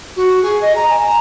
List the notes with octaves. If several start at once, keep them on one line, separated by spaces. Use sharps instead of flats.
F#4
G#4
D#5
A#5
G#5
A#5